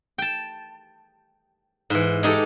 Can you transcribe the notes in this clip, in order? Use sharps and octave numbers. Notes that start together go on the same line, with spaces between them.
G5 A5
G#2 E3
G#3 D#4 G4 A4